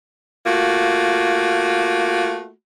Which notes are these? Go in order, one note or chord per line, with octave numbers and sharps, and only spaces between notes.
A3 A#3 F4 F#4